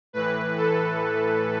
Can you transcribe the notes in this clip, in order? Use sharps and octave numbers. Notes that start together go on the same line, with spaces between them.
A2 E3 B4
A4